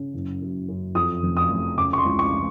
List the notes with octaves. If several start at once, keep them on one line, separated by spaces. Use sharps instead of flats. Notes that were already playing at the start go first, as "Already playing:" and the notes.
Already playing: C#3
F#1
F#2
F#2
F2 D#6
F1
D#6
F1
C#3 D6
C#6
C6
C#2
C#6